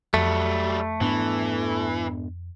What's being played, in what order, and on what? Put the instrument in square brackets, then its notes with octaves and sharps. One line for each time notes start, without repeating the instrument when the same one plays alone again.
[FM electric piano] F2 [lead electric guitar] F#3 G3 [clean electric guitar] A3
[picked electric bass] G#2 B3 D4 [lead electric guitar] E3